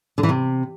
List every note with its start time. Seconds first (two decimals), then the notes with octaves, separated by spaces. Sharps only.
0.18 D3
0.23 E3
0.29 C3